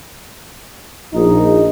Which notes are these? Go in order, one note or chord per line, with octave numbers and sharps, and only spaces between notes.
A#1 D#4